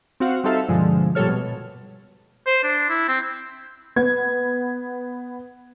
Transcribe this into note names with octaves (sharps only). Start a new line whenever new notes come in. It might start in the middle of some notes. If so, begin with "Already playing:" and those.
C4 F#4 F5 F#5
G3 C4 D#4 A4 E5 F5
G2 B2 D3 F3 G#3
A#2 F3 G3 A4 C#5 F6
B2
C5
D4
E4
C4
B3 G#6